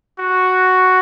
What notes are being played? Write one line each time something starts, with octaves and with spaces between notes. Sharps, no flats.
F#4